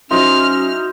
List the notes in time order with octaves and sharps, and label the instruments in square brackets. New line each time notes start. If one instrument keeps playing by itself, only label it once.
[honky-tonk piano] F#3 D#4 E4 [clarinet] C#4 [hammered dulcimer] C5 [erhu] F6